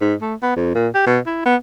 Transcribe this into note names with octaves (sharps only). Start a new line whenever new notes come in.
G#2
A3
B3
F2
A#2
G4
B2
E4
B3